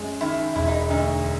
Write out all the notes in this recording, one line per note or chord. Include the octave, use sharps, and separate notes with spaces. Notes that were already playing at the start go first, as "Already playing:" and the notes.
Already playing: F#2 G#3
D#3 E4
E1 E4
D#4
D2 D#4